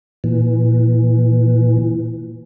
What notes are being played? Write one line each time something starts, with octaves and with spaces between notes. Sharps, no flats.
A#2 E3